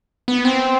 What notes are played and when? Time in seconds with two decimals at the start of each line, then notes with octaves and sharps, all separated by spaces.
0.28 B3
0.45 C4